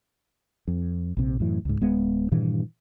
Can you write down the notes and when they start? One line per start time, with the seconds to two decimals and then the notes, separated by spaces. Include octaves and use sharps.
0.68 F2
1.17 A#1 C3
1.40 F#2 A2 E3
1.65 C#2 G#2
1.81 D1 G#3 B3
2.32 G2 A#2 D#3 E3